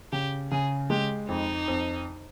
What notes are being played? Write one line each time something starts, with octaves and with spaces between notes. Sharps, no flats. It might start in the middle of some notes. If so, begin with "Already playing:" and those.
C#3 G4
C#3 G#4
G#3 G4
F2 D#4
F2